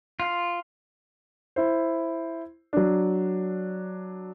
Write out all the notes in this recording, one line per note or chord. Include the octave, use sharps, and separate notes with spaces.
F4
E4 C5
F#3 D4